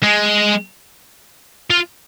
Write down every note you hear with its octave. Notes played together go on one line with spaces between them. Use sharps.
G#3
F4